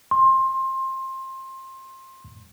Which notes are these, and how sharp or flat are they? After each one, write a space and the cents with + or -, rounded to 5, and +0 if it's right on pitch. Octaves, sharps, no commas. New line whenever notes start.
C6 +20